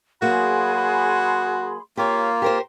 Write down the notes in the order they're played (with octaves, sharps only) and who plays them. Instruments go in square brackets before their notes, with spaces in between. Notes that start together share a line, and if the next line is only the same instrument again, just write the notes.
[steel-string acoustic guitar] F#3 A#3 [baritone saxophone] F#4 [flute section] G#4 B5 C6
[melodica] A#3 F4 [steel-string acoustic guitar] G4 C#5
[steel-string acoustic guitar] G4 A#4 C5